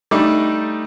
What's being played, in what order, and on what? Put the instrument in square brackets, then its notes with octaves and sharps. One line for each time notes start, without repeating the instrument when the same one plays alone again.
[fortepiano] G3 A3 D4 D#4